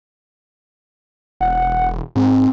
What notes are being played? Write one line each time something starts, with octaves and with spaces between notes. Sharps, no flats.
E1 F#5
G#2 C4